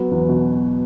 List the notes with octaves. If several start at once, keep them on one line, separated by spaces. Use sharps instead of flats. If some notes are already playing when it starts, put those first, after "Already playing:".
Already playing: F#3 B3
E2
B2